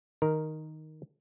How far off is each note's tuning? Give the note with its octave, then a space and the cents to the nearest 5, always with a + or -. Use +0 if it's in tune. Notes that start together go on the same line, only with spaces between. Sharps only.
D#3 +0 A#4 +0